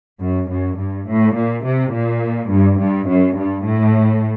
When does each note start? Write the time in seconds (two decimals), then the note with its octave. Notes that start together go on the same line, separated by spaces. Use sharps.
0.21 F#2
0.50 F#2
0.78 G2
1.07 A2
1.35 A#2
1.65 C3
1.93 A#2
2.50 G2
2.79 G2
3.08 F#2
3.37 G2
3.65 A2